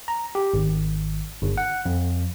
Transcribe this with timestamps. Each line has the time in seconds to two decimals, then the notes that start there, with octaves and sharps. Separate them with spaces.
0.08 A#5
0.35 G4
0.54 G#1
1.42 G1
1.58 F#5
1.86 F2